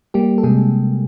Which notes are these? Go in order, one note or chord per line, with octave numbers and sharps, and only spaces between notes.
G3 A#3 G4
A4
C3 G#3 G#4